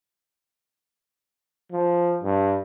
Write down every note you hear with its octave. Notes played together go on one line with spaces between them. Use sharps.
F3
G2